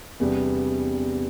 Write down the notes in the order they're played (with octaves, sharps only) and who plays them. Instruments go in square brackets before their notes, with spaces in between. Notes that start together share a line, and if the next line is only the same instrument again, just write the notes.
[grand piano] E2 C3 G3 B3 D4